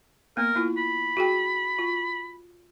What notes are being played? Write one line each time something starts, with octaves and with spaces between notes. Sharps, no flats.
A#3 B3 A#4
A#3 E4 F4
B5
F#4 G#4 G5
F4